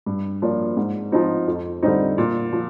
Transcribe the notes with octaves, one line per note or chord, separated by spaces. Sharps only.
G2
F3 A#3 D4
G#2
F3 C4 D#4
F2
D3 G3 C4 D#4
A#2
F3